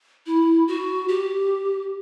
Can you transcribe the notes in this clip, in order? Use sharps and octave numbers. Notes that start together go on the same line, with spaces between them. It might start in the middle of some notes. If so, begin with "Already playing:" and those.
E4
F#4
G4